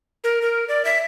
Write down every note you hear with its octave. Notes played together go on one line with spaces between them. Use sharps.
A#4
A#4
D5
E5